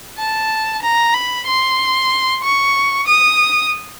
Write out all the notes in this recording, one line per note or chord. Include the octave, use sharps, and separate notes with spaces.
A5
A#5
B5
C6
C#6
D#6